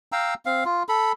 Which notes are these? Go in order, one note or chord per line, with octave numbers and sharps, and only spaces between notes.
F5 G5 A#5 E6
C4 F5
F4
A4 B5